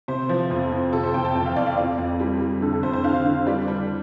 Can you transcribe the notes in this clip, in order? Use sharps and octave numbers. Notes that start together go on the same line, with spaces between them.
C3 C5
F3
F2
F2
C3 A4
C5
F2 G5
A5
F2 G5
F5
F2 D5
F5
F2 D5
F2
G3
G3
D3 A4
A4
F2 C5
C5
D3 F5
D3
G3 D5
G3